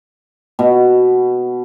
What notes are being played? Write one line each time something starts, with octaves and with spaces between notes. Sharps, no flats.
B2